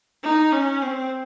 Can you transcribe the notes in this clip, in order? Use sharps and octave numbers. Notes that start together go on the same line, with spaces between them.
D#4
C#4
C4